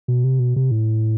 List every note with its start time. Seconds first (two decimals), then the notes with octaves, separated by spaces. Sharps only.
0.08 B2
0.24 C3
0.39 B2
0.56 C3
0.71 A2